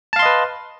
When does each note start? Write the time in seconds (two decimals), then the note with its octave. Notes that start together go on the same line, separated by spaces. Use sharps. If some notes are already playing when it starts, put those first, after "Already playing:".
0.13 A5
0.16 F5
0.19 C6
0.22 D#5
0.26 B4